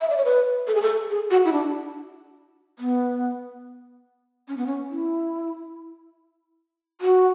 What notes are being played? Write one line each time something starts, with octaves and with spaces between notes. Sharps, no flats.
E5
D5
C#5
B4
A4
G#4
A4
G#4
F#4
E4
D4
B3
C#4
B3
C#4
E4
F#4